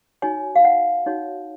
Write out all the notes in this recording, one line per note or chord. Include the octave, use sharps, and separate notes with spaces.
D#4 F#4 C#5 G#5
F5
F#5
D#4 F#4 C#5